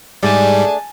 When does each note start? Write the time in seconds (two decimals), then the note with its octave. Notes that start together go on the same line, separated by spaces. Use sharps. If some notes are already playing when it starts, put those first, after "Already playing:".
0.23 G#2 G3 A3 D4 G#4 G#5 A5